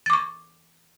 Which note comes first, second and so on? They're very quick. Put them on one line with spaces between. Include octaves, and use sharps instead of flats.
A6 D6 C#6